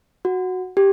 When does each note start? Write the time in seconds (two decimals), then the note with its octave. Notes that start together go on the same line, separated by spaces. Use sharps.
0.25 F#4
0.77 G4